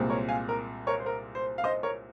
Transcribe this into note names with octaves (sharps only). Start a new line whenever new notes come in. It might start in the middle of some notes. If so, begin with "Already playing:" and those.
Already playing: C2 A#2 G#3 C4
A#4 C#5
F5 G#5
A#4
A#4 C#5
C5
A#4
C5
F5
C5 D#5
A#4 C#5